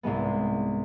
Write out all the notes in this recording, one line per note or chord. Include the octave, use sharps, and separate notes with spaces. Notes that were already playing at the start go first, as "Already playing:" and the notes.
C2 G#2 G#3 B3